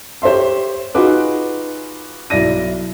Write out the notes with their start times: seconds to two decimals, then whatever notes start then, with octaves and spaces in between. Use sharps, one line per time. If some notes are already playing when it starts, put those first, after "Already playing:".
0.22 G4 C5 C#5 E5 C6
0.95 D#4 F4 F#4 G#4 B4 D6
2.30 B1 E4 D5 A#6 D#7